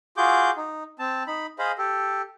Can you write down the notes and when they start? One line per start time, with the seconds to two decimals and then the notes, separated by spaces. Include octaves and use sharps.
0.17 F4 F#4 G#4 D6 G6
0.57 D#4
0.99 C4 A5
1.27 D#4 B5
1.59 G#4 C5 D#5 F5 B5
1.78 G4 A4